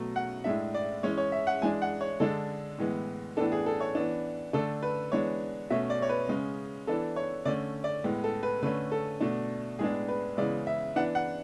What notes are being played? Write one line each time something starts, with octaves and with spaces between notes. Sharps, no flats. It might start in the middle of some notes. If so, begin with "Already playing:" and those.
Already playing: B2 F#3 A3
F#5
A2 G#3 D4 E5
D5
E3 G#3 C#4 C#5
C#5
E5
F#5
E3 G#3 D4 G#5
F#5
C#5
D3 G#3 D4 A4
A2 E3 G#3 B3
A2 E3 B3 D4 A4
G#4
A4
C#5
E3 B3 D4
D3 A3 D4 A4
B4
E3 G#3 B3 D4 C#5
B2 A3 C#4 E5
D5
C#5
B4
C#3 G#3 C#4
E3 B3 D4 A4
C#5
D3 A3 C#4 D5
D5
A2 G#3 B3
A4
B4
D3 A3 C#4 B4
A4
B2 A3 D4
A2 G#3 B3 D4 G#4
B4
C#3 E3 G#3 B3 D5
E5
E3 B3 D4 F#5
F#5